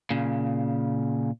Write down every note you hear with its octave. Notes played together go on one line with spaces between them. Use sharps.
A#2 C#3